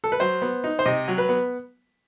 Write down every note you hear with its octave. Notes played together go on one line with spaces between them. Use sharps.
A4
B4
F#3 C5
B3
D#4
C5
C3 D#5
F#3
B4
B3